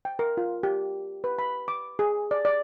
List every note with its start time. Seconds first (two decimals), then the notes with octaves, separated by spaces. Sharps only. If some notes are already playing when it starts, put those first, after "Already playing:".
0.05 G5
0.19 A#4
0.37 F4
0.63 G4
1.24 B4
1.39 B5
1.68 D6
1.99 G#4
2.31 D5
2.45 D5